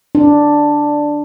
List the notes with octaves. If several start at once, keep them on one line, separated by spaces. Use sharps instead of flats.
D4